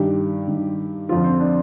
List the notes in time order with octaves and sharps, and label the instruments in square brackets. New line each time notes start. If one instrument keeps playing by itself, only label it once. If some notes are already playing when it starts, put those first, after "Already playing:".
Already playing: [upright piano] G2 D#3 G4
G2 D#3
F2 D3 F3 F4
C4
D4